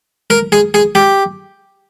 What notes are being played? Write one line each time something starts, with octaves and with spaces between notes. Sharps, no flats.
A#4
G#4
G#4
G4